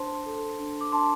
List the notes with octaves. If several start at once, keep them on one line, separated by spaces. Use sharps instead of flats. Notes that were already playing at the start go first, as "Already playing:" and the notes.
Already playing: D4 C5 A5 C6
A4
D4
D6
D4 A5 C6